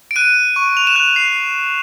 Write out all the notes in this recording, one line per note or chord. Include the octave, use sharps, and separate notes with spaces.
D7
F#6 D#7
C#6
F7
E7
F#6 F7
C7